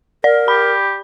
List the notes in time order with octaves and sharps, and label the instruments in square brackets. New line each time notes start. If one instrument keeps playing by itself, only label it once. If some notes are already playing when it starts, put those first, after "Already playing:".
[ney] A#4 [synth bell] D5
[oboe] G4 [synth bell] B5